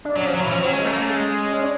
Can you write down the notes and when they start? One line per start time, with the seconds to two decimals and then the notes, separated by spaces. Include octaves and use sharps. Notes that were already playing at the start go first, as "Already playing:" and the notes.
0.05 D4
0.16 F#3 C#4
0.26 F3
0.34 F#3
0.42 E3
0.50 F3 C#4
0.59 C4
0.63 F#3
0.66 C#4
0.74 G#3
0.85 A3
0.93 A#3
1.02 A3
1.10 G#3
1.53 C#4
1.62 D4